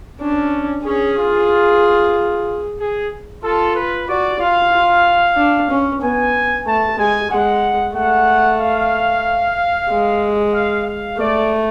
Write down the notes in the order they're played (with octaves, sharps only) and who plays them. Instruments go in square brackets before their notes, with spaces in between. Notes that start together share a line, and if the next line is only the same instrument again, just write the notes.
[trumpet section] C#4 [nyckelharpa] D4
[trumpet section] C#4 [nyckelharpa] G#4
[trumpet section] F4
G#4
[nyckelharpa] F4 [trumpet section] A4
[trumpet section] B4
[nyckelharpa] F#4 [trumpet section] D5
[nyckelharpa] F4 [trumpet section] F5
[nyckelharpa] F4
D4
C#4
[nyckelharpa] B3 [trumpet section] G#5
[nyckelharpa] A3 [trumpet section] A5
[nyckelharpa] G#3 [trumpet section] G#5
[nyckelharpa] G#3 [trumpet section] F#5
[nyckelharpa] A3 [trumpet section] F#5
[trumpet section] F5
[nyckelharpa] G#3
[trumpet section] F5
F5
[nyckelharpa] A3 [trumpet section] D5